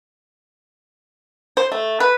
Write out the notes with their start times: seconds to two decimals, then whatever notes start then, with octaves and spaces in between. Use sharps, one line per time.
1.57 C5
1.72 A3
2.00 B4